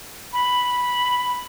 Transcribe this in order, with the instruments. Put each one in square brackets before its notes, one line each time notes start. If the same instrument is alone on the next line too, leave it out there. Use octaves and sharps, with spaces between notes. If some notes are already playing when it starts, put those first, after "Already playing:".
[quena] B5